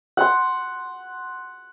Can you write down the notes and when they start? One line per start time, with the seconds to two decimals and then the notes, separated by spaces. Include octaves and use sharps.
0.17 F#5 C6